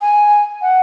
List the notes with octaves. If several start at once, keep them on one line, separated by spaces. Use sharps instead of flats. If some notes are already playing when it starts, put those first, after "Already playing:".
G#5
F#5